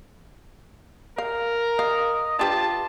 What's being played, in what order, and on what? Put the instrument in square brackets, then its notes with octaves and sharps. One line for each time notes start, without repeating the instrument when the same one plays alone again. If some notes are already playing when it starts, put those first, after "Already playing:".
[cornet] A#4 [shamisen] F5
[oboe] D#5 [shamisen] F5
[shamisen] D4 G4 B4 [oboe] F4 [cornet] A5